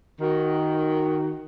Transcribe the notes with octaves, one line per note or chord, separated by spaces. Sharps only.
D#3 F#4